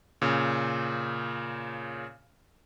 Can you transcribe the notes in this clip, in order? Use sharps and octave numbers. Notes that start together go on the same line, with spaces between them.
A#2 C#3